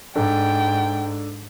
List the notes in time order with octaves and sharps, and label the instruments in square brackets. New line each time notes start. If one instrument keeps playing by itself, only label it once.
[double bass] G#2 [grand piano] D4 A4 [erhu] G5